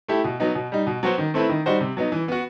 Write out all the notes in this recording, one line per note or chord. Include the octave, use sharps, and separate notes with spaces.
A3 E4 G4
B2
F#3 B3 D#4
B2
G3 D#4
B2
F#3 B3 F#4 C5
D#3
A3 C4 E4 B4
D#3
G3 D#4 F#4 C5
C3
F#3 B3 D#4
E3
B3 F#4